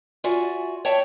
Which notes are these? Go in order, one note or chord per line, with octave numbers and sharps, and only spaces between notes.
F4 F#4 D5 E5 G#5
C#5 D5 E5 G5 A5